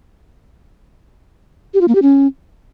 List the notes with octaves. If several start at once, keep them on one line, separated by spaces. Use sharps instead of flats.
G4
F4
A#3
G4
C#4